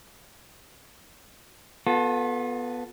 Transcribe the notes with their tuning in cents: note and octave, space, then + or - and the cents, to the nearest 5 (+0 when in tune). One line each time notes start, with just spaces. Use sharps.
B3 +0 F4 +40 A4 +0